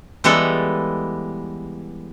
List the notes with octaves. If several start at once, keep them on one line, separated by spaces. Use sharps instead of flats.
E3 G3 G#3 B3 A4